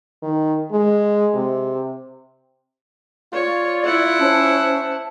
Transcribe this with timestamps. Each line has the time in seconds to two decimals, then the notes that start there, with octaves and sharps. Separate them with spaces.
0.23 D#3
0.72 G#3
1.34 C3
3.34 F4 C#5 D5
3.85 E4 F#5
4.19 C#4 C5 A5